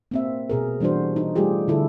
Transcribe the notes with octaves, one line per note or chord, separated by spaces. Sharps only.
A#3 C4 E5
B2 G#4 A#4
E3 G3 D4 F#4 C5
D#4
G3 A3 F4 G4 G#4
D3 E4 A4